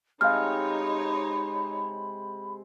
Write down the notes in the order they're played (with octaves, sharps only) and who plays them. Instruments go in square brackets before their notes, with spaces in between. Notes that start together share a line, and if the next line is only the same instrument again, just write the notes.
[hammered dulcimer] C3 G#3 [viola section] D#4 C#5 [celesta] F5 F6 [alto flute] B5